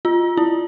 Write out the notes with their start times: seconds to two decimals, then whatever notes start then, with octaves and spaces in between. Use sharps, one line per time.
0.05 F4
0.37 E4